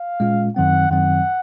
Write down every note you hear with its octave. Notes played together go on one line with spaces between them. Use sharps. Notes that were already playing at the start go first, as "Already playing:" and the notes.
Already playing: F5
A#2 G#3 C#4 F4
F#2 D#3 F#3 C4 F#5
F#2 D#3 F#3 C4 F#5